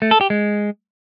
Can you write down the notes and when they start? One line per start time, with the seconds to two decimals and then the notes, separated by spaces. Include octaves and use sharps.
0.02 A3
0.11 A4
0.21 G4
0.30 G#3